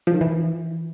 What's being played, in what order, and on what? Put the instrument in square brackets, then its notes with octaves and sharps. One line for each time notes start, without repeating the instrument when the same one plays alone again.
[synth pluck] F3
D#3
E3